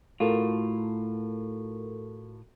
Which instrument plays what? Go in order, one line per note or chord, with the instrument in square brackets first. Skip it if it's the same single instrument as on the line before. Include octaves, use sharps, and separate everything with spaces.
[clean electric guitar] A2 F4 [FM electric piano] F#4 A4 A#4